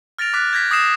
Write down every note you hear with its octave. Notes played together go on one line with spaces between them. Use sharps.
F6 A6 A#6 D7 F7
D6 F#6 B6
G6 G#6 A#6 B6
D6 D#6 A#6 C7 E7